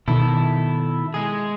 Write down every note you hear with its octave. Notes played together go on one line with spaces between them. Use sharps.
B2 D#3 E4 A4
G#3 G#4